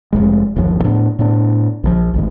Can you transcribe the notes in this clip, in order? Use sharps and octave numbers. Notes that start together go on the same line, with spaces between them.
F1 D#2 G#3
G1 D#2 F3
A2 B3 D4
A2 B3 D4
A#1 C#3 F3
G#1 D2 G#2